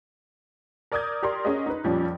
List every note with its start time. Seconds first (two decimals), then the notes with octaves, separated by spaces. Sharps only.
0.92 A#4 D5 D6 D#6 G6 G#6
1.23 G4 A#4 D5 C6
1.45 C#4 F#4 G#4 A#4 D#5
1.66 D#4 B4
1.84 F2 A#2 F3 G3 C#4